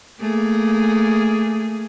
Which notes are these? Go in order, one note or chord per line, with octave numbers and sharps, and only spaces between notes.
A3 A#3 G#4